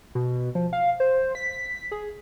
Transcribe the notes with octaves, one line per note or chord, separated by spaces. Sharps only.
B2
F3
F5
C5
B6
G#4